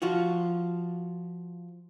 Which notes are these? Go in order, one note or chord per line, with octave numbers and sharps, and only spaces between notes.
F3 F4 F#4